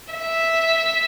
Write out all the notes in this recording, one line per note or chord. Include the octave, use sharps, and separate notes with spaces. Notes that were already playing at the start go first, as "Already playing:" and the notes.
E5